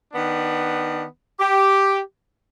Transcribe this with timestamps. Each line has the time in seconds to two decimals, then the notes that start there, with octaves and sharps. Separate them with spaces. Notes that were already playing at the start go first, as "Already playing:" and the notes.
0.12 D#3 B3 D4
1.40 G4